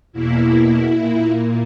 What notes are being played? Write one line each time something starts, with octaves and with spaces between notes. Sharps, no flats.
E2 B2 A#3 E4
A#2 A#3